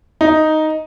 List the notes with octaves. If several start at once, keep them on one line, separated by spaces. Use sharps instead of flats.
D#4